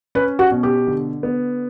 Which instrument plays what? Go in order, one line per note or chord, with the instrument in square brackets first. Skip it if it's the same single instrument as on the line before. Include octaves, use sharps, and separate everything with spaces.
[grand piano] C#4 [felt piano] B4
[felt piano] F#4
[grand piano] B2
[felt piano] G4
[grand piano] D3
B3